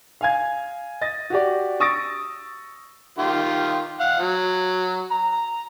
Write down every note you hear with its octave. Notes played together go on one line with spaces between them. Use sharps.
F5 G#5 G#6
D#5 A6
F#4 G4 D5
C#6 D#6 E6 A6 A#6 D7
D#3 F4 G4
F5 F#5
F#3
A#5